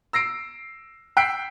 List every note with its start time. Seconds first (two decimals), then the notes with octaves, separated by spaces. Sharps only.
0.13 E6 A#6 C7 D7
1.17 G5 E6 F#6 B6 C7 D7